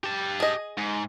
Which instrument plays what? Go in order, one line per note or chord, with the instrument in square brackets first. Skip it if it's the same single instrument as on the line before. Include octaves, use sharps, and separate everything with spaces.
[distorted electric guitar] G4 A5
[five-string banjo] G#4 D#5
[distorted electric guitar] G#2